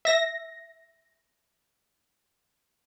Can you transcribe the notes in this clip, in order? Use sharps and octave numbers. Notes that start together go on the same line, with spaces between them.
E5 A#6